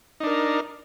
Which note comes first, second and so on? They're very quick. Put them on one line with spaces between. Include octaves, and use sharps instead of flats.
D#4 D4 A#4